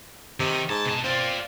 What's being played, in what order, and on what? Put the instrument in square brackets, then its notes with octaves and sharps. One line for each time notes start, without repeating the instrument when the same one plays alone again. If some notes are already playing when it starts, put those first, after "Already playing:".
[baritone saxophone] C3 [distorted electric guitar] D#3
[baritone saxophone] G#2 [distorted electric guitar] A5
[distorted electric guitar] B2 A5
[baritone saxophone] C4 [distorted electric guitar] F4 D5